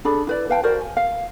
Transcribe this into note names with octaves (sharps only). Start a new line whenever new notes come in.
D4 G#4 A4 B5
E4 B4 D5
B4 F5 G5 A5
F#4 A#4 C5 D5
G#5
F5